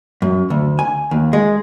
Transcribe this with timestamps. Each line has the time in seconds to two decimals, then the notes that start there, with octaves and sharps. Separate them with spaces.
0.22 F#2
0.50 D2
0.79 G#5
1.11 D#2
1.33 G#3